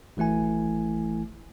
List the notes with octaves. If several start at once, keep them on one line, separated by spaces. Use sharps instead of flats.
G#1 E3 A3 E4 G#5